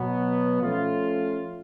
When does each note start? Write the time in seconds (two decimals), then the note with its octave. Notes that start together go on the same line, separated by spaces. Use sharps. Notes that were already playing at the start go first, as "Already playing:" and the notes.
Already playing: B2 F#3 B3
0.62 F3 A3 C#4 F4